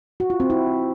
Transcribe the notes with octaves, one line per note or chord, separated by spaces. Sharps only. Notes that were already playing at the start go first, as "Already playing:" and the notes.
F#4
F4
C4
E4